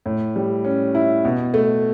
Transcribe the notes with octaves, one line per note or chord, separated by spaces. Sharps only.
A2
G3
C#4
E4
B2
A3